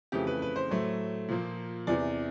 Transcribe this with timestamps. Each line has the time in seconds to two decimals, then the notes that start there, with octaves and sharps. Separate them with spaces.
0.12 F2 C#3 E3 A3 G4
0.27 B4
0.42 B4
0.56 C5
0.70 A2 F#3 A3
1.28 A#2 F3 A#3
1.87 E2 C3 E3 D5